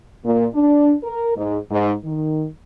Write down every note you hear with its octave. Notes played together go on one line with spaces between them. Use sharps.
A#2
D4
A#4
G#2
G#2
D#3